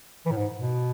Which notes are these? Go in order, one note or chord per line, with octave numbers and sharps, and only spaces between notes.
E3
A2
G#2
B2